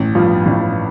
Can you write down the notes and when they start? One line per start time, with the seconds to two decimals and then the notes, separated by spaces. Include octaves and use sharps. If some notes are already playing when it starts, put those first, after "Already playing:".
Already playing: A1
0.15 G2 F3
0.46 A1